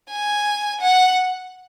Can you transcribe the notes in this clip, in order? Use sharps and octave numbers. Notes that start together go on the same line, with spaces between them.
G#5
F#5